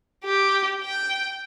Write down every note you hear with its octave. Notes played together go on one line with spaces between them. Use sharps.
G4
G5